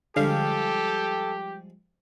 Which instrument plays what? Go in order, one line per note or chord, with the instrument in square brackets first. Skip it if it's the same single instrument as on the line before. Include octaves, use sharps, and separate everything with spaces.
[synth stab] D3 F5 [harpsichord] F3 G3 G#3 [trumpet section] G4 [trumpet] A4